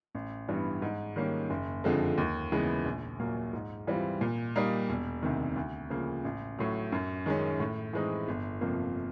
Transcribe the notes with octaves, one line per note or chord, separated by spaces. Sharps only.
A1
G2 E3 G3 B3
G#2
D#3 G3 A#3 C#4
F#1
F2 D3 F3 G#3
D#2
C#3 E3 G#3 B3
A#1
A#2 F#3 A#3
G#2
E3 G3 C4 F4
A#2
G3 A#3 D#4
E1
D2 C3 D#3
D2
C#3 F3 A#3
A1
A2 F#3
F#2
D#3 G#3 C#4
A2
E3 G#3 C4 D#4
G1
F2 C3 F3 A#3